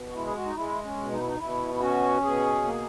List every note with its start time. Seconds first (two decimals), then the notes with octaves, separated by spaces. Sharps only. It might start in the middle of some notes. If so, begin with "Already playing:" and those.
Already playing: B2
0.09 F#4
0.14 G#3 E4
0.26 G#4
0.35 F#4
0.45 D#4
0.55 G#3 E4
0.84 C#4
0.97 B2
1.12 D#4
1.20 E4
1.28 D#4
1.39 B2 E4
1.74 E4
1.80 C#4 F#4
2.22 B2 G#4
2.64 A#3